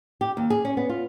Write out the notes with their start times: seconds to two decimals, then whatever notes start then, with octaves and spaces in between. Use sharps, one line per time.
0.21 G4
0.37 D#2
0.50 G#4
0.65 C#4
0.77 B3
0.89 F4